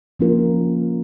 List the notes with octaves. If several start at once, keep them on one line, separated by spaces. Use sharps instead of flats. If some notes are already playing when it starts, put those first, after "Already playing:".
F3 A#3 C#4 F4 A#4